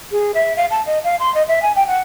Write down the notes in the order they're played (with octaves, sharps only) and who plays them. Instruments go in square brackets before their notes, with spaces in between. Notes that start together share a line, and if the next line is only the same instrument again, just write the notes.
[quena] G#4
E5
F5
A5
D#5
F5
C6
D#5
E5
G#5
G5
F#5